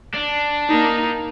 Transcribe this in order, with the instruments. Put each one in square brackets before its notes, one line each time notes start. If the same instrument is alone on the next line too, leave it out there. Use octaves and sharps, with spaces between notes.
[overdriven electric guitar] D4
[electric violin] A#3 D#4